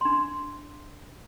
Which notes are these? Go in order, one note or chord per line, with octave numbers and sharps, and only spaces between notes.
D4 C6